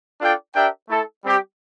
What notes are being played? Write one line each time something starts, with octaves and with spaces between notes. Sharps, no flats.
D4 F4 A4 D5 G5
D4 G4 A#4 E5 G5
A3 E4 A4
G3 C4 G4